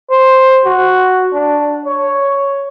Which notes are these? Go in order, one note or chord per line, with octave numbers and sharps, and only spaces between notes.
C5
F#4
D4
C#5